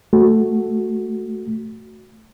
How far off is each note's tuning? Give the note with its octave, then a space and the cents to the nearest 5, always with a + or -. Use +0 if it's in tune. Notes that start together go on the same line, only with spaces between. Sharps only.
A3 +0 F#4 +0